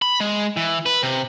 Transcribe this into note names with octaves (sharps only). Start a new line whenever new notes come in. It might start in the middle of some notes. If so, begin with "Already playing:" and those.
B5
G#3
E3
B4
C3